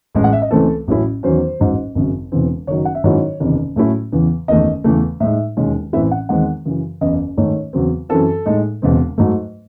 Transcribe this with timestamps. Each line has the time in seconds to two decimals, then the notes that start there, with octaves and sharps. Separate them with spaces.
0.15 A1 A2 G#3
0.24 F#5
0.33 E5
0.42 D#5
0.51 C#2 C#3 E3 A3 C4 A4
0.87 A1 A2 F#3 C#4 E4
1.23 E2 D#3 F#3 C#4 C5
1.60 A1 G#2 F#3
1.95 G#1 F#2 C#3
2.32 E1 E2 C#3 E3 C4
2.67 F#1 F#2 D#3 F#3 C#5
2.85 F#5
2.95 E5
3.04 G#2 D#3 F#3 C#4 E4 C#5
3.40 F#1 E2 C3 D#3
3.76 A2 F#3 A3 C#4 E4
4.12 E2 C#3 E3
4.48 F#1 E2 D#3 A3 D#5
4.84 E2 C#3 E3 A3
5.20 A2 G#3 D#4 E5
5.57 E1 D#2 D#3 G#3 C#4
5.93 A1 A2 E3 C4 E4 E5
6.11 F#5
6.29 E2 D#3 G#3 C4 F#5
6.65 F#2 C#3 E3
7.01 F#1 E2 C#3 D#5
7.37 G#2 D#3 A3 C#5
7.73 E2 C#3 F#3 C4
8.09 F#2 E3 C4 A4
8.46 A2 G#3 D#4
8.82 E1 E2 C#3 G#3 C4
9.18 G#2 F#3 A3